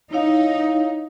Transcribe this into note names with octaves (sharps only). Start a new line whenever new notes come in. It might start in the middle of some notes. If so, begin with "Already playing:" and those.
D#4 E4 C#5 F5